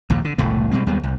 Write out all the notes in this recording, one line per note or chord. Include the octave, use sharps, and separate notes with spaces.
A#1 D#2 G#2
D3
E1 C2 A2 A3
B2 G3 G#3 C4
D#2 G3 G#3 B3
C2